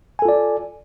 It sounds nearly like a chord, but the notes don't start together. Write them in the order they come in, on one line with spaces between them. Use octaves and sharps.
G#5 A4 F4 D5